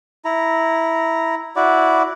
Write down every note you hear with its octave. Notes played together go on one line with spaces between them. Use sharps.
E4 A#5
E4 F#4 D5